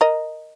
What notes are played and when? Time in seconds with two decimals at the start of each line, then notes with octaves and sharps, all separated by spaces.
0.01 A#4 D#5